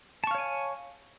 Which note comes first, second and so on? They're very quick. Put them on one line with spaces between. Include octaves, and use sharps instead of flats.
A5 C#6 F5 C#5 G#5